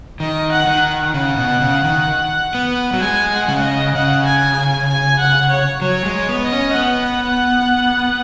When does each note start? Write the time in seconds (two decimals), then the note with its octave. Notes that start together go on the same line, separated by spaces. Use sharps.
0.20 D#3 D#5
0.51 F#5
0.67 D#3
1.14 C#3 F#5
1.37 B2
1.61 C#3
1.84 D#3
2.55 B3
2.93 F#3
3.01 G#3 G#5
3.33 F#5
3.48 C#3
3.64 D#5
3.94 C#3 F#5
4.26 G#5
4.57 G#5
4.89 G#5
5.19 F#5
5.51 C#5
5.82 F#3 C#5
6.05 G#3
6.13 C#5
6.29 B3
6.45 D#5
6.52 C#4
6.75 B3 F#5